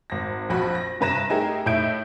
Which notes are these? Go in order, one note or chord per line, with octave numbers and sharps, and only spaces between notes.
G#1 A#6
A#1 F2 F#4 B5
A#6
G2 C3 B4 A#5 A#6 E7
A3 D#4 E4 G4 G#4 A#4
A2 A3 D#4 E5 G6 D7